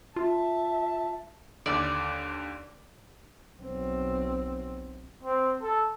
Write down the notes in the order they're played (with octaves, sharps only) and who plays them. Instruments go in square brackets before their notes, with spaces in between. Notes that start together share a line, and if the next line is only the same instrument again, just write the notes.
[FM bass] F4 [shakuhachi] E5 [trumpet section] A5
[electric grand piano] D#2 D3 [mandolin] D5
[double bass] B1 C4
[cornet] C4
A4